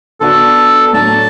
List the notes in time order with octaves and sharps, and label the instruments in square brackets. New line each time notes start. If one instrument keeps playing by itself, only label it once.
[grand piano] D3 B3 D4 F#4 [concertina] A4
[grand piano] A2 F#3 A3 D4 F#4 [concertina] A5